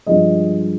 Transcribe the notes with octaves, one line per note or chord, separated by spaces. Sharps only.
G2 F3 G#3 D#5